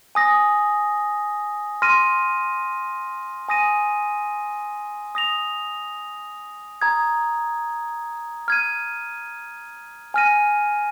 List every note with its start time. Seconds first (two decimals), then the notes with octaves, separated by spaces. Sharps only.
0.15 G#5 D#6 A#6
1.82 C6 F6 A#6 D#7
3.49 G#5 D#6 A#6 D#7
5.15 D#6 A#6 F7
6.82 A#5 D#6 G#6
8.48 F6 G#6 D#7
10.14 G#5 F6 A#6 D#7